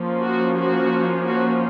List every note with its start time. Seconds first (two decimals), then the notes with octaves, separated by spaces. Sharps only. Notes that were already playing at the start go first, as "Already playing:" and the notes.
Already playing: F3 A#3 C#4
0.23 F#4
0.57 F#4
1.24 F#4